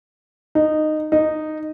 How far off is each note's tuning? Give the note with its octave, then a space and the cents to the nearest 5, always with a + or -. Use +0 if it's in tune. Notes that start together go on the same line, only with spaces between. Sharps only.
D#4 -15
D#4 -10